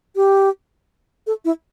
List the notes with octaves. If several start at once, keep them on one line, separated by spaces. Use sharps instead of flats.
G4
A4
E4